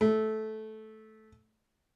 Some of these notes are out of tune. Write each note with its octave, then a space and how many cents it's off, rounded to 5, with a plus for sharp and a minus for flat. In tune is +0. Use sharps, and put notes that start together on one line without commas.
A3 -15